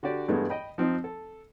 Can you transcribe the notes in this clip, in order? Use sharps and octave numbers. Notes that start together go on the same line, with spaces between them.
D3 F#4 G4 D5
G2 E3 G#3 A3 B3
D#5 G5 B5
F3 C4 D#4
A4